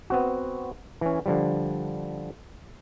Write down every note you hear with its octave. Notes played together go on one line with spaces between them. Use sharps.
B3 C4 F#4
E3 C#4
D3 F3 G3